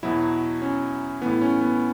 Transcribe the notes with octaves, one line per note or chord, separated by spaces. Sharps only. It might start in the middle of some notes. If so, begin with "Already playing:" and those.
E2 B2 F#3 E4
C#4
A2 E3 B3
C#4
B3